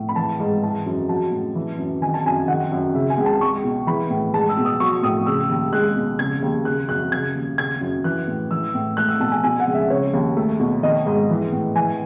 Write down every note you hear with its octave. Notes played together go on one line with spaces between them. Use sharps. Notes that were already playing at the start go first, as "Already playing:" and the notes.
Already playing: A2
B5
E3 A5
G#2
E3 A5
F#2
F#3 A5
A2
E3
F#2
D#3 G#5
A5
F#2 G#5
D#3 F#5
F#2
C#3 E5
G#5
C#2
A5
G#3 C#6
B2
E3 B5
A2
G#3 A5
E6
B2
D#6
F#3 C#6
A2 D#6
C#3 E6
D#2
G#3 F#6
B2
C#3 G#6
D#2
C#3 F#6
F#2 F#6
C#3 G#6
D#2
C#3 G#6
F#2
E3 F#6
A2
E3 E6
A2
A3 F#6
E6
B2 A5
G#5
B2 G#5
F#5
C#2
E5
C#3 C#5
D#2
A3
B2
D#3 D#5
G#2
E3
A2
E3 G#5